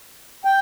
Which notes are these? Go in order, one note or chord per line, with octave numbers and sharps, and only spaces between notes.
G5